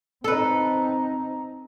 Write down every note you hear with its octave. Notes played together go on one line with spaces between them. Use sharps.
C4 D#4 A4 B4